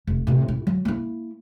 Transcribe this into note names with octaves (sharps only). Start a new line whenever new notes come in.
F1
A2 C3
E4
F#3
A#3 E4